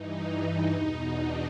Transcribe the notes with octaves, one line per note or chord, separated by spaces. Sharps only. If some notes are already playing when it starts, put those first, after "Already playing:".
Already playing: G2 E3 D#4
D#4
E2 B2
D4